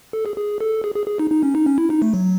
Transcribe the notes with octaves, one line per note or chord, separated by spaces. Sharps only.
A4
G#4
G#4
A4
G#4
G#4
G#4
D#4
D#4
C#4
D#4
C#4
E4
D#4
A3
F#3